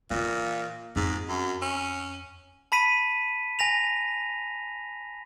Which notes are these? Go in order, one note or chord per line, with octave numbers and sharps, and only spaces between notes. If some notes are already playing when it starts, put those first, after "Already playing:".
A#2 E3 F4
F2 G#2
F#2
C#4
A5 B5 B6 D#7
G#5 A#6 F7